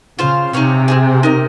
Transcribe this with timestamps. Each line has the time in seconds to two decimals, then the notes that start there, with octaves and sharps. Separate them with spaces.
0.18 C#3 F4 C5 F5
0.53 C3 D#4 G#4 C#5 F5
0.88 C4 D#4 G#4
1.23 D#4 A#4 D#5